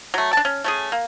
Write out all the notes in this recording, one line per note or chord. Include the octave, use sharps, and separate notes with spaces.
F#3 A3
D4 A5
C#4
A3 C#4 G#4
A#3